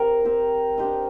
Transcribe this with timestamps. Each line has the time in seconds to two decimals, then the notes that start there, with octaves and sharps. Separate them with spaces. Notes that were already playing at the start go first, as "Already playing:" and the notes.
Already playing: C4 G4 A#4
0.25 C4 G4 C5
0.78 D4 G4 C5 D#5